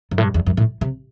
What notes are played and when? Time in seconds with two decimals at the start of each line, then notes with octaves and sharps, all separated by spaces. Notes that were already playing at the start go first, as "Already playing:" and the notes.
0.11 F#2
0.18 A2
0.23 G2
0.34 E2
0.46 F#2
0.57 A2
0.81 C3